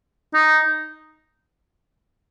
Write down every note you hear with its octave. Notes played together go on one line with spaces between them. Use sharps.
D#4